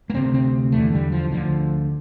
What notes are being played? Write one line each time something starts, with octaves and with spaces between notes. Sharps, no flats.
A#3
D2 C3 C4
C4
E2 D3 A3
G3
F3
D2 D3 F3